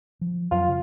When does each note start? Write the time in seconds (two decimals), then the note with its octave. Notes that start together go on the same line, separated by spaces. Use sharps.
0.21 F3
0.51 F2 F#3 F4
0.68 C#3